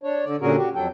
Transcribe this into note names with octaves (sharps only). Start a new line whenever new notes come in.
D4 C#5
D3 D5
A#2 D3 C#4 F#4 G#4 A#4
F#4 G4
F2 F#3 A4 G5